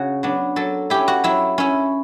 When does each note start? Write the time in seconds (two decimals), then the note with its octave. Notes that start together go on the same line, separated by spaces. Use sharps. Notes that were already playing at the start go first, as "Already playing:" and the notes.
Already playing: C#3 F#4
0.23 F#3 B3 D4
0.56 F#3 A4
0.90 C#4 E4 G4
1.08 F#4
1.24 F#3 E4
1.58 C#4 E4